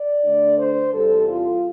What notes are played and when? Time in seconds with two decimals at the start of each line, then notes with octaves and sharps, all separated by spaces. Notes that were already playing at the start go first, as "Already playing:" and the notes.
Already playing: D5
0.25 D3 A3 D4
0.59 C5
0.93 E2 C3 G3 A4
1.28 F4